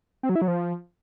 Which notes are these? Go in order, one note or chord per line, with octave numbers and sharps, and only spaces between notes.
C4
F#3
E4
F#3
F3